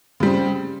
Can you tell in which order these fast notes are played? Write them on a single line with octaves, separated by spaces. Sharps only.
C#3 G3 C4